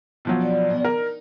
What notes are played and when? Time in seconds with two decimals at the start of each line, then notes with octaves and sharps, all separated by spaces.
0.25 B2 F3 F#3
0.40 D4 D5
0.70 B2 F#3 D#5
0.85 D#2 A#4
0.97 D#4